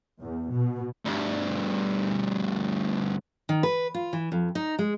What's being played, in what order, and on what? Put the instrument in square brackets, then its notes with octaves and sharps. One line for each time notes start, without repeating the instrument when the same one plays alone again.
[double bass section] E2
B2
[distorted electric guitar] D2 G2
[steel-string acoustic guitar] D#3
B4
F4
E3
F2
D#4
G#3